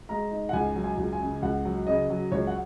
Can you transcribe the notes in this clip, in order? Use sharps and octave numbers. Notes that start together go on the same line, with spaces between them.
G#3 A#5
D#4
F#5
C#2 G#5
F#3
G#5
C#2
G#5
C#3
C#2 F#5
F#3
C#3 D#5
F#3
C#2 C#5
F#5